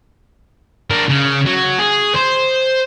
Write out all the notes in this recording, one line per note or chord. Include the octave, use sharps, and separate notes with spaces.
D4 A#4
C#3
F#3
G#4
C5